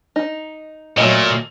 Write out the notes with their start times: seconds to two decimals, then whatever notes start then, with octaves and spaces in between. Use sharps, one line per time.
0.16 D#4
0.98 A#2 F#3 A3 D#5